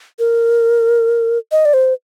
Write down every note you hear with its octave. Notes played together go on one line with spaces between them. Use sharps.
A#4
D#5
D5
C5